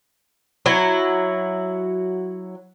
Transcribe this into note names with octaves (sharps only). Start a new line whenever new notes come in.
F#3 E4